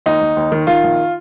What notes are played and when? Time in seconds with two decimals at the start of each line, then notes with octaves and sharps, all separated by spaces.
0.06 D#2 D#4
0.21 D#2
0.37 D#2
0.52 D#3
0.67 D#3 F4
0.84 A#1